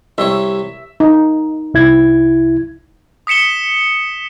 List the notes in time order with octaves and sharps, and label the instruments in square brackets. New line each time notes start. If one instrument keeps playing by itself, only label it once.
[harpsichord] C2 G3 C#5 [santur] E5
[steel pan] D#4
[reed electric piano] C2 E4 G#6
[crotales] D#6 B6 C#7 E7 G7